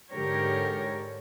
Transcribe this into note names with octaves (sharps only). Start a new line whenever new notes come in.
G#2 D3 G4 A#4 C#5